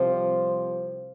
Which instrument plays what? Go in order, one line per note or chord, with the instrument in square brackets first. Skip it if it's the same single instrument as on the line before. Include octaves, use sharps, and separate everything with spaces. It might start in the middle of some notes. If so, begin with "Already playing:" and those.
Already playing: [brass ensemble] C2 C3 F3 G4 C5